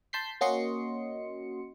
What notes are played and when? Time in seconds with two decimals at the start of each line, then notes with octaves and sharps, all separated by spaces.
0.13 A5 C6 G6 B6 C7
0.41 A#3 C#4 F#4 D#5 C6 C#7